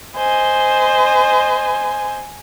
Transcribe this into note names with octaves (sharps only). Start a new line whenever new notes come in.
C5 D#5 G#5